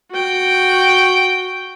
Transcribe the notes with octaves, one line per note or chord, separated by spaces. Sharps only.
F#4 G5